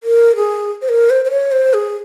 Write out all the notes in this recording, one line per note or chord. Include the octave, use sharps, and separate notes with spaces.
A#4
G#4
C5
A#4
C5
C5
C#5
C5
G#4